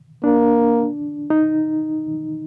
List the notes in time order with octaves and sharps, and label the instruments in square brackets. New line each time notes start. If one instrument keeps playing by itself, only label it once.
[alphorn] A#3 [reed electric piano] D4
[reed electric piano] D#4